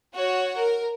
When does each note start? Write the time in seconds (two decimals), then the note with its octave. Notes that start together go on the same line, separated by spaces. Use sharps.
0.15 F#4 C#5
0.58 A#4